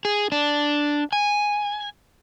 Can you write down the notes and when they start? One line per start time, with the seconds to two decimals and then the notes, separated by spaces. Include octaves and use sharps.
0.05 G#4
0.32 D4
1.13 G#5